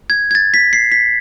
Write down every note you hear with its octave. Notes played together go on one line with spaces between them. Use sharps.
G#6
G#6
A6
B6
C7
B6